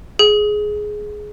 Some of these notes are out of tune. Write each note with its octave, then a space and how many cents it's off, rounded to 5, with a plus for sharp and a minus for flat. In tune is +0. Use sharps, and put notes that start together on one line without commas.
G#4 +10